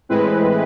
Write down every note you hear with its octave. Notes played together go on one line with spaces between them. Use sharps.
A2 E3 G#3 C4 E4 B4